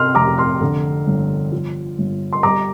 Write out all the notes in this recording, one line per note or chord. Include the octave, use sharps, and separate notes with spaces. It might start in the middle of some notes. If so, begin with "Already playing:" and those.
Already playing: C3 C6 F6
F1 A#5 D6
C6 F6
D3
G1
F3
G1
C6
G3 A#5 D6